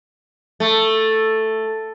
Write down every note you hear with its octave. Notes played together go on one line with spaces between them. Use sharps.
A3